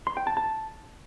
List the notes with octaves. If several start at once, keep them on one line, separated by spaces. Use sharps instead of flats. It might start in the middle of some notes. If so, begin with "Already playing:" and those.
C6
G5
A5
A5